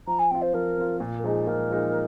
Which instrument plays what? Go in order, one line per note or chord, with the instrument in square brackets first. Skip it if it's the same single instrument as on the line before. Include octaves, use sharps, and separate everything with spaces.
[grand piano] F3 [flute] A#5
[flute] G#5
[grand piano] C4 F4 [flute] G5
[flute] C5
[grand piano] F3 [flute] A#4
[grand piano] C4 F4
A#2
[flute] A#4
[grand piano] F3 G#3 D#4 [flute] G#4
[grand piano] A#2 [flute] A#4
[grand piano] F3 G#3 D#4